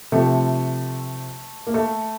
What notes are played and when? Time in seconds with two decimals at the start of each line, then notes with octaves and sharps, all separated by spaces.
0.12 C3 F3 A3
1.67 A#3
1.74 A3